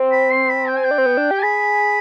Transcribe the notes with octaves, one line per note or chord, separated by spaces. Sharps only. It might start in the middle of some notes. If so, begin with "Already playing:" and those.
Already playing: C4
B5
C6
B5
G5
G#5
G5
D4
C4
B3
D4
G4
G#5
G#4 B5